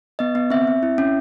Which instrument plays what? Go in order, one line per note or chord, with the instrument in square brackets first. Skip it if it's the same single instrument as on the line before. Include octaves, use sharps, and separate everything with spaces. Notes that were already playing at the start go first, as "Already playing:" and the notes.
[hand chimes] B3 D#5
B3
C4 E5
C4
E4
C#4